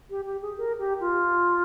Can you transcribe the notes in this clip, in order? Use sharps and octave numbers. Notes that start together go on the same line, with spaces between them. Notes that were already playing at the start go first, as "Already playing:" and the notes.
G4
G4
G#4
A#4
G4
F4